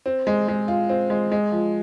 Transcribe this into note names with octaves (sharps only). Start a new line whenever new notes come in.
C4
G#3
G#3
F4
C4
G#3
G#3
F3